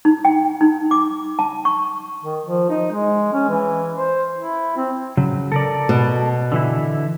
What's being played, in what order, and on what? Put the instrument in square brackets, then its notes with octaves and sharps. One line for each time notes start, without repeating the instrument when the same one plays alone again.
[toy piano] D#4
G5
D#4
D6
A5
C#6
[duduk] D#3
F3
D#4
G#3
C#4
E3
C5
E4
C4
[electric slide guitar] C#3 F#3
A4 A#4 D5
[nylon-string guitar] B2
[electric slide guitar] D3 E3 E4